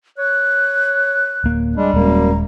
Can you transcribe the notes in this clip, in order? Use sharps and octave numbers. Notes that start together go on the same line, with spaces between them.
C#5 F#6
D1 A#3
G3 G#3 D4
D#1 F#2 G#3 A#3 A#5